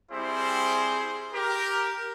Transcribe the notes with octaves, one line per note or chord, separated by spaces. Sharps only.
G3 C4 E4 G4 G#4 C5
G4 A#4